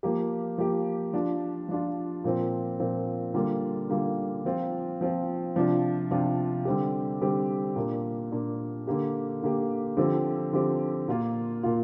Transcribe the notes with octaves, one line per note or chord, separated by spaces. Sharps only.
F3 A#3 G4
F3 A#3 G4
F3 D4 F4
F3 D4 F4
A#2 F3 C4
A#2 F3 C4
D3 G3 A#3 F4
D3 G3 A#3 F4
F3 C4 F4
F3 C4 F4
C3 F3 D4 F4
C3 F3 D4 F4
D3 G3 C4 G4
D3 G3 C4 G4
A#2 A#3 D4
A#2 A#3 D4
D3 A#3 G4
D3 A#3 G4
D3 F3 C4 G4
D3 F3 C4 G4
A#2 A#3 F4
A#2 A#3 F4